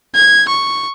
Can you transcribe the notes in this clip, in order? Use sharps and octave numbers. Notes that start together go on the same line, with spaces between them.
G#6
C#6